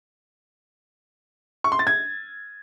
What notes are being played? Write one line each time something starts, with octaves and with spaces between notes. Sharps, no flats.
C#6
C6
A6
G#6